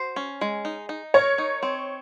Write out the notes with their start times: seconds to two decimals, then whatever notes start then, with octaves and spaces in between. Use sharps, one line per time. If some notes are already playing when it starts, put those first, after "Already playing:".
Already playing: F#4 C5
0.16 C#4
0.41 G#3
0.65 D#4
0.89 D#4
1.14 A#4 C#5
1.38 D#4
1.63 C4